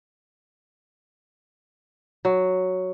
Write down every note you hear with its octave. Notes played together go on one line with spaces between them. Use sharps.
F#3